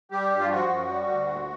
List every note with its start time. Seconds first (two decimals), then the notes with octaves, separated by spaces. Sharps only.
0.11 G3 G4
0.31 G2
0.40 F4
0.50 F3 F#4
0.69 F#2
0.89 G3
1.08 D2
1.28 A#2